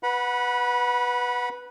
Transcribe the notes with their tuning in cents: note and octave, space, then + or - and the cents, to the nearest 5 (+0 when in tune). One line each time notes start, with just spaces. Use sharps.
B4 +0 F#5 -15 B5 -25